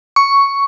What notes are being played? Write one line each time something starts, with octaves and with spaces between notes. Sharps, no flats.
C#6